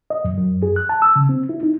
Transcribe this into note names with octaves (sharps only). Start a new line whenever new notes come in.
D#5
F#2
F#2
G#4
F#6
A5
E6
C#3
C4
E4
D#4